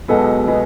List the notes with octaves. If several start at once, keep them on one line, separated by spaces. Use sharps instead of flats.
B1 B2 G#3 B3 A4
B2 G#3 B3